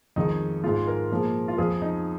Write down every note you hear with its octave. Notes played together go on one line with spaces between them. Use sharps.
F2 D#3 G#3 D#4
G#2 G#3 F4
A#4
A#2 F3 G#3
F4
F2 F3 G#3 G#4
D#4